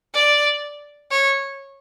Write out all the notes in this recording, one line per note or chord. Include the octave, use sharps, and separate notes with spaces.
D5
C#5